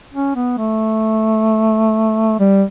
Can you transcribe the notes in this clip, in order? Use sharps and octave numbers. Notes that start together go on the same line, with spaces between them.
C#4
B3
A3
G3